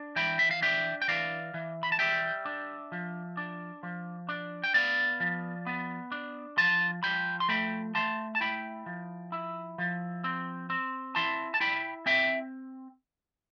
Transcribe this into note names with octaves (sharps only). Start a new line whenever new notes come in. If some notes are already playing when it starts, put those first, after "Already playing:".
Already playing: D4
E3 G5 B5
E5
F5
D4 E5 G5
G5
E3 D5 F5
E3
B5
A5
G3 E5 G5
D4
F3
D4
F3
D4
G5
B3 D5 F5
F3
B3
D4
F3 A5 C6
F3 G5 B5
C6
A3 G5 B5
A3 A5 C6
A5
E4 G5 B5
F3
E4
F3
C4
C4
E4 A5 C6
A5
E4 G5 B5
C4 E5 G5